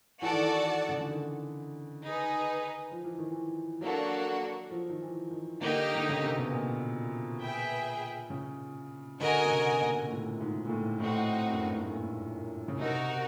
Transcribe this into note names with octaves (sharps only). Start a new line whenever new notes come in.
E3 F#4 A4 D5 F#5
D#3
E3
C#3
D3
D#3
D#4 G#4 B4
F3
E3
D#3
E3
F#3 A#3 D4 F#4 A4
F3
D#3
E3
D#3
D3 A#3 D#4 G4
D3
C#3
C3
B2
A#2
G#4 B4 E5 G5
C#3
D3 F#4 A#4 D#5 G#5
C3
C#3
B2
A#2
A#2
A2
G#2
A#2
A2
A2 C4 D#4 F#4
F#2
G2
G#2
A2
A#2
C#3
C3 D#4 F#4 A#4